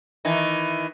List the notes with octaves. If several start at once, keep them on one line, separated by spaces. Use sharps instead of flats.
D#3 E3